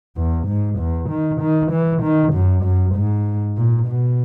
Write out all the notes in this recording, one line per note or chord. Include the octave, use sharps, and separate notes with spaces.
E2
G#2
E2
D#3
D#3
E3
D#3
F#2
F#2
G#2
A#2
B2